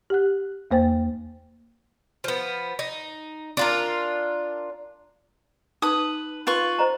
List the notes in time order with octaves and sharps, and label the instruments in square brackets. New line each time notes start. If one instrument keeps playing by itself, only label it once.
[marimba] G4 F#5 F#6
E2 A#3 C5 G5 A6
[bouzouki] F3 B3
D#4
D4 F4 A#4
[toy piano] D#4 A5 [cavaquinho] B4 D#6
[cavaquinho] F4 B4 C#6
[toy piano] C5 D#5 A#5